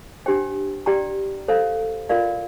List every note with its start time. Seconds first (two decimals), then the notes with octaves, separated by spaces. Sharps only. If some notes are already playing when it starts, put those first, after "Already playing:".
0.26 D4 G4 C5 G5
0.86 G4 D5 G5 A#5
1.48 A4 C5 F5
2.10 F4 A#4 D5 F5